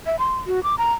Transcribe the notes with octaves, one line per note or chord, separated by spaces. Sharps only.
E5
C6
F#4
D6
A#5